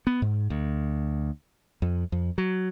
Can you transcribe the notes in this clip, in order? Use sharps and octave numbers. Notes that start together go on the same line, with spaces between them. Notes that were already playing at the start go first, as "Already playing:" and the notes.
B3
G#2
D2
F2
F2
F#3